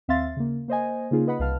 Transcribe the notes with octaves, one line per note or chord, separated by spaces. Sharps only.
D#2 C4 E5 F5 C6 A6
C#3 A#3
A#3 C5 D#5 G#5
C#3 A#3 D#4 F4 G#4
B4 D#5 F#5 B5
C2 B4 F5 A5 F6